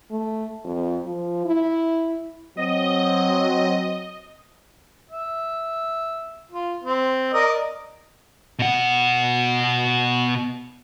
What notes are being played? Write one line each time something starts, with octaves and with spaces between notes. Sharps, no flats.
A3
F2
F3
E4
F#3 C4 D#5
E5
F4
C4
A#4 D5 D#5
B2 F#5